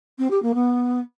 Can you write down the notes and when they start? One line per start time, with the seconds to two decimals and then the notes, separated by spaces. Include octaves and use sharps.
0.18 C4
0.30 G4
0.42 A#3
0.54 B3